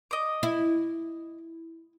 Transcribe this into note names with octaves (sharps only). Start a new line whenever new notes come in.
D#5 D6
E4